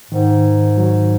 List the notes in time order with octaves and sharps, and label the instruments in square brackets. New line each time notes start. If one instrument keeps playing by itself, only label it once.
[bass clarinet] G#2 [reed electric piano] D#3
[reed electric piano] F#3